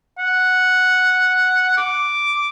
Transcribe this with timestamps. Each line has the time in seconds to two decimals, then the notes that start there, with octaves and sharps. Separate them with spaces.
0.19 F#5
1.77 D6